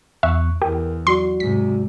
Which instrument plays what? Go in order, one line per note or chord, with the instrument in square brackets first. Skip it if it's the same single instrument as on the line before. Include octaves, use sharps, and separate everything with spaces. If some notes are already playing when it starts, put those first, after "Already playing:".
[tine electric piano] E2 C#6 F#6 [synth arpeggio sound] E5
[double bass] E2 [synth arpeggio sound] G4 [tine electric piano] A#4
[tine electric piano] F#3 F#4 D5 [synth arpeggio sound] C6
[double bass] G#2 C3 [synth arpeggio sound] B6